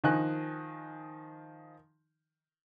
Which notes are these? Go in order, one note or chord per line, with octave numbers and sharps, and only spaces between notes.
D#3 F3 D#4 G#5 F#6